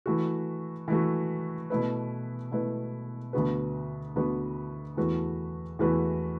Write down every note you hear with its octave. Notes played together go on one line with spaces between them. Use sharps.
E3 A3 F#4
E3 A3 F#4
B2 A3 E4 B4
B2 A3 E4 B4
D2 D3 B3 F#4 B4
D2 D3 B3 F#4 B4
E2 E3 A3 F#4 B4
E2 E3 A3 F#4 B4